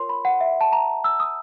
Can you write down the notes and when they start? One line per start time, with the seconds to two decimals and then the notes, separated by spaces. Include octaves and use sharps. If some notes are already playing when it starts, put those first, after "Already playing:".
Already playing: F4 A#4 C#5 C6
0.09 B5
0.25 F#5
0.41 E5
0.61 A5
0.73 A#5
1.04 E6
1.20 D#6